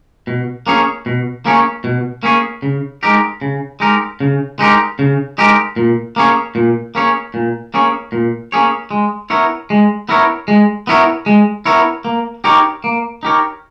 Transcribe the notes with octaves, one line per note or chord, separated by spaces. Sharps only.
B2
A#3 C#4 G#4 C#5
B2
A#3 C#4 G#4 C#5
B2
A#3 C#4 G#4 C#5
C#3
G#3 D#4 G4 A#4
C#3
G#3 D#4 G4 A#4
C#3
G#3 D#4 G4 A#4
C#3
G#3 D#4 G4 A#4
A#2
A#3 C#4 G#4 C#5
A#2
A#3 C#4 G#4 C#5
A#2
A#3 C#4 G#4 C#5
A#2
A#3 C#4 G#4 C#5
G#3
B3 E4 A#4 C#5
G#3
B3 E4 A#4 C#5
G#3
B3 E4 A#4 C#5
G#3
B3 E4 A#4 C#5
A#3
D#4 G4 A#4 C#5
A#3
D#4 G4 A#4 C#5